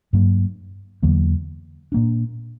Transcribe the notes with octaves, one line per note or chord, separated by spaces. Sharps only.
G2 F#3 A#3
E2 D3 F#3 A#3
A#2 A#3 D4